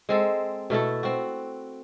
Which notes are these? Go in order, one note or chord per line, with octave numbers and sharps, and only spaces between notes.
G#3 C4 A4
B2 A3 E4 A4
C4 F#4